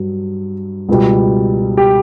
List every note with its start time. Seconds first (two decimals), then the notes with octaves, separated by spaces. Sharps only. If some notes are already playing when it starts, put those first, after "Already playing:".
Already playing: G2 F#3
0.89 C#2 B2 G3
1.77 G4